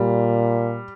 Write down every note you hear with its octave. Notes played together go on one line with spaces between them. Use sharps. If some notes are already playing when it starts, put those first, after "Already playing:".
Already playing: A#2 G3